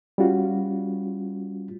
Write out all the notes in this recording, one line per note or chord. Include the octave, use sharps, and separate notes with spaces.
G3 C#4 F4 F#4